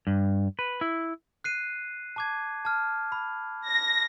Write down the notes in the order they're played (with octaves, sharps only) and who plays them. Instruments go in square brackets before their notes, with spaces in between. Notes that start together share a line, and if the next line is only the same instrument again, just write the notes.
[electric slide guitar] G2
B4
E4
[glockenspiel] F#6 C7 D#7
A5 D6 G#6
A5 F6
B5
[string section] A#6